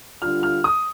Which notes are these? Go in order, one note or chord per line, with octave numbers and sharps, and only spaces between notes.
D3 G3 D4 F4 F6
F6
D#6